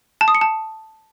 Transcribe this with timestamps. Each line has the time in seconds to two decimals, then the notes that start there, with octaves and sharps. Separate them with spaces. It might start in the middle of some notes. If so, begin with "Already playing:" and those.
0.21 A5
0.28 D#6
0.35 C#7
0.41 A5